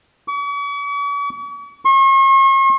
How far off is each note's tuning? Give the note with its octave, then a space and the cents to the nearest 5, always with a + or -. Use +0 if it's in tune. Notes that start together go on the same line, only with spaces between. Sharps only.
C#6 +45
C#6 -45